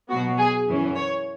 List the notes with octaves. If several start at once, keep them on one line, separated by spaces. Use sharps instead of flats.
B2 F#3 B3 F#4
G#4
F#2 E3 C#4
C#5